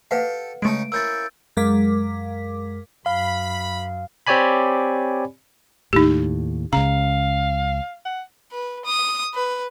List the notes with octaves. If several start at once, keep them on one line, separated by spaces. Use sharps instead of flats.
G4 A4 B4 F5 F#5
C#3 G#3 A3 C#4 D#4 D7
A#3 C#4 E4 E6 G6 A6
F#2 G#3 A#4 F5 D6 B6
F#2 F5 B5
C4 G4 C#5 D5 G#5 B5
D#2 A2 D#4 G4
C#2 C#3 F5 A#5
F#5
B4
D#6
B4